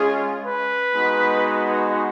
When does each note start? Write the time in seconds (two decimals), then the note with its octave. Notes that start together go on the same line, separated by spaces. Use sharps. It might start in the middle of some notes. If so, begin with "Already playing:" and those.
Already playing: G#3 C#4 F4 G#4
0.46 B4
0.93 G#3 B3 D#4 F#4